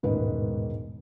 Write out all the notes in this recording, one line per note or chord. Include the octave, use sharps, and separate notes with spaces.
E1 A1 G#2 D#3 D#4 B4